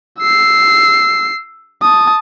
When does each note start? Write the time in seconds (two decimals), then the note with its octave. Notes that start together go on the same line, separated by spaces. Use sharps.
0.19 E6 C7
1.82 A5 D#6